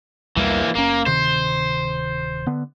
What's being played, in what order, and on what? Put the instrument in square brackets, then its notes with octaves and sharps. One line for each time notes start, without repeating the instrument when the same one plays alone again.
[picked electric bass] B1 E2 G3 [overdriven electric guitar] E3 A#3
[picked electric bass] F#1 C#4 [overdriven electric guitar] A#3
[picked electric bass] D1 C3 D#3 [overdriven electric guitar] C5
[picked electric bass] D3 B3